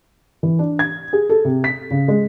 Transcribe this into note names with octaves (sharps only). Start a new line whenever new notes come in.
E3
D4
G#6
G#4
A4
C3
B6
C#3
G#3